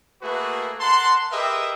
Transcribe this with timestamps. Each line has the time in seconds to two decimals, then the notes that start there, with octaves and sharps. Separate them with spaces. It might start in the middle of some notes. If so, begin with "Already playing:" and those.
0.22 A3 A#3 F#4 G#4 B4
0.81 A#4 F#5 A5 C6
1.32 G4 G#4 A#4 B4 D#5 E5